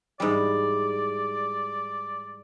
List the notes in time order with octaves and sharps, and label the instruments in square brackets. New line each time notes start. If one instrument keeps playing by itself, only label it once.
[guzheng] G#2 E3 G3 [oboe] D5